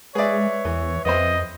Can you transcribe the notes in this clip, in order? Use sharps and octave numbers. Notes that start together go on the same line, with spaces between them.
G#3 G#4 B4 C#5 D5 E5
E2 E3
F2 B3 C4 C5 D#5